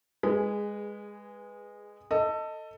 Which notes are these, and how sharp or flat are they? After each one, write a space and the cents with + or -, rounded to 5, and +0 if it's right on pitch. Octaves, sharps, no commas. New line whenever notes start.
G#3 -15 G#4 +0 B4 +0
A4 +20 D#5 +5